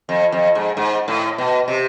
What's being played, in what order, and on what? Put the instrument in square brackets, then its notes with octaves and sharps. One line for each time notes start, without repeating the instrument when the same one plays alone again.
[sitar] F2
F2
G#2
G#2
A2
B2
C3